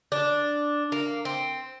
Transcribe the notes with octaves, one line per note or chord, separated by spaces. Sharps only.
D4
A#3
C4